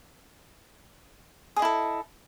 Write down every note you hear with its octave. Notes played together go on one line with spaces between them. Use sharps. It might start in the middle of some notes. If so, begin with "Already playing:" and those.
E4 G#4 A4 D#5